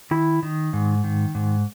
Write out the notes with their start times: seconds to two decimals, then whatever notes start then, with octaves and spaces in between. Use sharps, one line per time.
0.11 D#3 E4
0.43 D#3
0.73 G#2
1.04 D#3
1.35 G#2